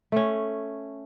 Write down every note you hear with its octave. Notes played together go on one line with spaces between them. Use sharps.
A3 C#4